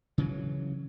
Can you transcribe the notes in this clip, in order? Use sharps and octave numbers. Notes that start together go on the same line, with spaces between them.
C#3 E3 F#3